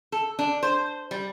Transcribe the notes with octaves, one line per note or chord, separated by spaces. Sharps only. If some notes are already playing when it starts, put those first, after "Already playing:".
A4
D4
C5
G3